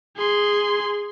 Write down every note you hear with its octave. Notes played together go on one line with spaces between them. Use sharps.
G#4 C6